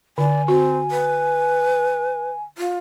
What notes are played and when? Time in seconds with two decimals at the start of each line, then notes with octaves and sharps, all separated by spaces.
0.18 D3 D5 G#5
0.48 C4 F#4
0.91 B4
2.58 F4